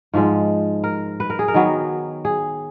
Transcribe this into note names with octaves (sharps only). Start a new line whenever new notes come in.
G#2 F3 G#3
A#4
B4
A#4
G#4
A#4
D#3 F#3 B3
G#4